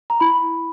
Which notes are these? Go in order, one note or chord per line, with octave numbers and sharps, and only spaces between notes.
A#5
E4 B5